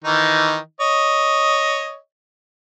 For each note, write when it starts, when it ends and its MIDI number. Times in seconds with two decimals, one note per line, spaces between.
0.04 0.58 51
0.04 0.58 52
0.04 0.58 63
0.81 1.97 73
0.81 1.97 75